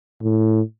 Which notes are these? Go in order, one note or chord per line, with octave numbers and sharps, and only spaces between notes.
A2